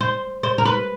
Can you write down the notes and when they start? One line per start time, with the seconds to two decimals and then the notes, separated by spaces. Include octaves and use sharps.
0.01 C5
0.43 C5
0.58 A#4
0.65 B4